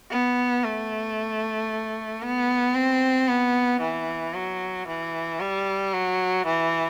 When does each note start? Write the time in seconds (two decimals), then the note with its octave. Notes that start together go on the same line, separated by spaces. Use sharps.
0.10 B3
0.64 A3
2.22 B3
2.75 C4
3.28 B3
3.81 E3
4.34 F#3
4.87 E3
5.40 G3
5.93 F#3
6.46 E3